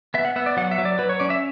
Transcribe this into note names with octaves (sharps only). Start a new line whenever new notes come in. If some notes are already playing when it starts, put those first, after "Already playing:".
B3 E5
F#5
B3 E5
D5
F#3 F#5
E5
F#3
D5
F#3 B4
C#5
C#4 D5
E5